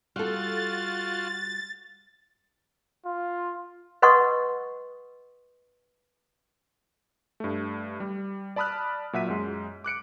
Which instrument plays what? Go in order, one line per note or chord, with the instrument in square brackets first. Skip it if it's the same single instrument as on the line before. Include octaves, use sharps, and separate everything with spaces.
[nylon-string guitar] G3 A4 [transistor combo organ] F4 F#4 [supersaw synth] A6
[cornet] F4
[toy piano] B4 D#5 F#5 C6 C#6 D#6
[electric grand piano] G2 A3
G3
D5 A5 B5 D#6 F6 F#6
A#2 F#3 E5 F#5 B6 D#7
F#2 G#3
D6 F#6 C#7 D7